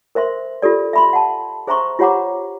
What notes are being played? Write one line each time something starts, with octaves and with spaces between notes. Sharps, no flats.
A#4 C5 E5 C6
F4 G4 A4 D5
E5 B5 C6
F#5 A5
G#4 C5 E5 A#5 C6 C#6
F4 G4 C#5 F#5 A#5 D6